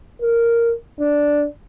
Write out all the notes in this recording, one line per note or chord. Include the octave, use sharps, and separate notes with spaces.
A#4
D4